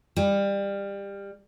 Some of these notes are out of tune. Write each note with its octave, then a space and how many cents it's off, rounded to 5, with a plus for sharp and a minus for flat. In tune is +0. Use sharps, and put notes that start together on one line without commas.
G3 +25